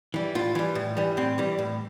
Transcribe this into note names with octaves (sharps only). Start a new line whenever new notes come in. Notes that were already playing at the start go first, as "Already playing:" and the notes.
E3 G3
A2 F4
E3 G3
A2
E3 G3
A2 C4
E3 G3
A2